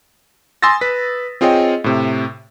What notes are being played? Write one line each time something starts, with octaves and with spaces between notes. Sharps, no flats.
G#5 C6 D#6 E6 A6 A#6
B4 B6
C4 F4 G#4 C#5 D#5 G5
A2 C3